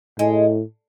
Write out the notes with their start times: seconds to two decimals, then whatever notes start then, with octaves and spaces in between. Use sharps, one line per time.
0.19 A2 G#3